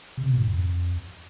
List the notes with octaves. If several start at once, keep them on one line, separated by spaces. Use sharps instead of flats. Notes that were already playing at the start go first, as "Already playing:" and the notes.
C3
B2
G#2
F2